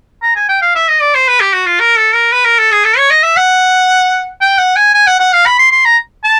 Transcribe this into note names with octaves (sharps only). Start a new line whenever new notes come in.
A#5
G#5
G5
F5
E5
D#5
D5
C5
B4
G4
F#4
F4
A#4
A4
A#4
B4
A#4
A4
G#4
A4
C#5
D#5
E5
F#5
G5
F#5
G#5
G#5
F#5
F#5
F5
B5
C6
C6
A#5
A5